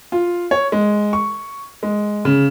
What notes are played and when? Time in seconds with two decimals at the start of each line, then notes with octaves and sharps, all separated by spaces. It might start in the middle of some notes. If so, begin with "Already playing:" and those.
0.12 F4
0.51 C#5
0.72 G#3
1.13 C#6
1.83 G#3
2.25 C#3